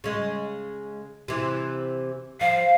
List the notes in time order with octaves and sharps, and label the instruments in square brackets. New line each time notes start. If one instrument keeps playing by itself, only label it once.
[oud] C#3 G#3
C3 E3
[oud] F3 [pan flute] F5